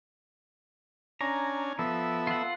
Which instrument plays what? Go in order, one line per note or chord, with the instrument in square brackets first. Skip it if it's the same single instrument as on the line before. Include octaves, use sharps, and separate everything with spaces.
[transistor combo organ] C#4 D4 G#5 [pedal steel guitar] A#5
[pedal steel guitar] F3 [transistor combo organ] B3 A4 E5
[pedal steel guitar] F4 F#5